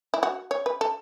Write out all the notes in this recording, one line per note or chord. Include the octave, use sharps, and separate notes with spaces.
E4
F#4
C#5
B4
A4